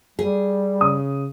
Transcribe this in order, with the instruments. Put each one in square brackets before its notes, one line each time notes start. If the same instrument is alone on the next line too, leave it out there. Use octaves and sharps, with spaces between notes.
[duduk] G3 [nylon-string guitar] G#4
[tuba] C#3 [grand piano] D#6